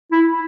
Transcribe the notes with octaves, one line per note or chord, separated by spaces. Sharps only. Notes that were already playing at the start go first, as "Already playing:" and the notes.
E4